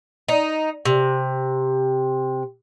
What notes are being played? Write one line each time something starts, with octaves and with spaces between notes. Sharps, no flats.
D#4
C3